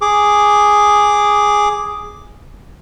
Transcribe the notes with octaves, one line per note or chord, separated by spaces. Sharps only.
G#4 D6